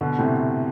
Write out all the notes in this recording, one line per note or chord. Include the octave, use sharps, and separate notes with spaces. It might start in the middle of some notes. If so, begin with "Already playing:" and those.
B2 D3
A2 C3